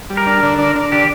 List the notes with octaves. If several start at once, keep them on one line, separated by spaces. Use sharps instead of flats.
G3
A#4
D4
D3
D4
D4
D3 G4